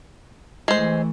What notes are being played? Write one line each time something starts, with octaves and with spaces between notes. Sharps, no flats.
E3 G#3 A3 C5